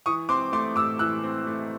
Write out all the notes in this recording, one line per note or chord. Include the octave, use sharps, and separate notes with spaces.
E3 C#6 D#6
C4 C6 D6
A3 C6 D6
A2 D6 E6
E3 E6 F#6
C4
A3